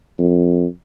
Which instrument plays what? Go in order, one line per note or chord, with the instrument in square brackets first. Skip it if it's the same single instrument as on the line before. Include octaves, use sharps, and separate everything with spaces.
[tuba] F2